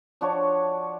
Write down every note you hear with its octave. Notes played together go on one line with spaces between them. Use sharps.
F3 D4 F#4 C#5